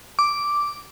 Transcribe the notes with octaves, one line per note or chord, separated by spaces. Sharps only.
D6